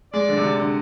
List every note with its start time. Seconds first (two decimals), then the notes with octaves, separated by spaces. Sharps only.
0.13 G#3 D5
0.29 D3
0.37 C3
0.44 D3
0.59 D3